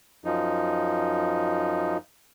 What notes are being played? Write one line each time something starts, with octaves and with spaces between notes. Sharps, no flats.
F#2 F3 D#4